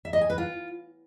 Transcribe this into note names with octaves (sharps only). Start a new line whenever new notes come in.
E5
D#5
G#5
B4
F4